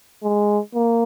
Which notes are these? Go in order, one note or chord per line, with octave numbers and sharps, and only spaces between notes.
G#3
A#3